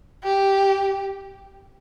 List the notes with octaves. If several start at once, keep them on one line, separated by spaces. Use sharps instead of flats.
G4